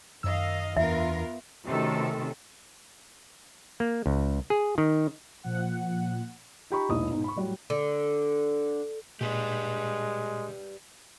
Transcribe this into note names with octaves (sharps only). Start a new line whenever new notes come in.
F#2 D#3 D#5 F5 E6
E2 E3 B3 D4 F4 A#4 E5
C3 D#3 A3 C#4 F#4 A4
A#3
C#2
G#4
D#3
A#2 F3 F#5
D#4 F4 G4 A#5 B5 C#6
E1 B1 A#2 E4 D#5 D#6
G#2 B2 D#4
B5 C#6
A2 F#3 G3 F#4
D3
A#2 G#3 G4 B4 D5